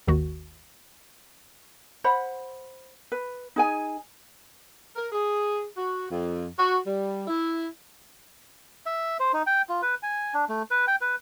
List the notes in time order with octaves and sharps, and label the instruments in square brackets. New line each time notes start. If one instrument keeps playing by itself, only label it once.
[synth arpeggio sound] G#1 D#2 D#3 F#4
[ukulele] C5 F#5 B5
B4
D#4 G#4 G#5
[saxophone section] A#4
G#4
F#4
F2
F#4
G3
E4
[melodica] E5
C5
D#4
G5
F4
B4
G#5
D4
A3
B4
G5
B4